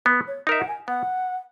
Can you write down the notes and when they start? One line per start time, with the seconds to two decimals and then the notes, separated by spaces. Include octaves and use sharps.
0.06 B3 B4
0.27 C#5
0.47 D#4 A#4 D#5 E5
0.59 F#5
0.68 G#5
0.88 B3 F#5